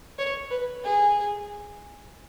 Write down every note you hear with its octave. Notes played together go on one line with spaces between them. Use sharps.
C#5
B4
G#4